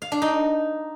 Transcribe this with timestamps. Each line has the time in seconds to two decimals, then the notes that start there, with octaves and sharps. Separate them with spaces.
0.02 F5
0.12 D4
0.22 D#4